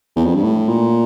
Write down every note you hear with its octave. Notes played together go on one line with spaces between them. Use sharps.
E2
F2
G2
A2
A#2